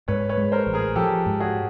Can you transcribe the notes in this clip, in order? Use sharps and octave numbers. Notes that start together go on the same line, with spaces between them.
G#2 B4 C#5
B4 C#5
G#3
A#4 C5
A1
G#4 A#4
F3 G4 A4
G#2
F#4 G#4